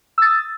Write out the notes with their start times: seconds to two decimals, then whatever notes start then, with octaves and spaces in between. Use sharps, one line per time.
0.18 E6
0.22 A6
0.26 D#6